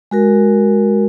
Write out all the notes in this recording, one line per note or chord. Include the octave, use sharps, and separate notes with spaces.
G#3 F#4 A#4